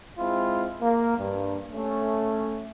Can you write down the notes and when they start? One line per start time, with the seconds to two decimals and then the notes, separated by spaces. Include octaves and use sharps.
0.18 G#3 C4 E4 F4
0.81 A#3
1.17 G2
1.72 A3 C#4